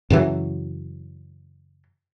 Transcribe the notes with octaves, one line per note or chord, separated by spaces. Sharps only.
F#2 C#3 E3 F#3